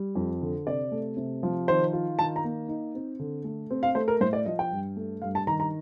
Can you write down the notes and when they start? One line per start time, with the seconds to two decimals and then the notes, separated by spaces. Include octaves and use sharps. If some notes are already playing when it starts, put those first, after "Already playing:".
Already playing: G3
0.16 F2
0.42 D3
0.66 C3 D5
0.92 A3
1.17 C3
1.43 F3
1.68 D#3 C5
1.93 F4
2.19 D#3 A5
2.36 A#5
2.44 A#3
2.68 D#4
2.95 C4
3.19 D3
3.44 A3
3.71 C4
3.83 F5
3.95 A3 C5
4.08 A#4
4.21 A2 C5
4.33 D5
4.46 F3 D#5
4.59 G5
4.71 G2
4.96 A3
5.22 G2 F5
5.35 A5
5.47 D#3 A#5
5.60 A#5